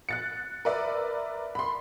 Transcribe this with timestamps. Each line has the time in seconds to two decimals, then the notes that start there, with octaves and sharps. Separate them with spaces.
0.09 F#6 A6 C#7
0.65 A#4 B4 D5 E5
1.55 B5 C6